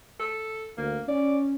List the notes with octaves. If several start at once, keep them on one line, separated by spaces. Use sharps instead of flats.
A4
D2 A#3
C#4 D5